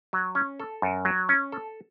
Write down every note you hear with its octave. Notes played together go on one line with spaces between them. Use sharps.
F#3
C#4
A4
F#2
F#3
C#4
A4